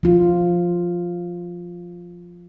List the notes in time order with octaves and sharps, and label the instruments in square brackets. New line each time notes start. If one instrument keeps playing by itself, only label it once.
[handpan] F3 F4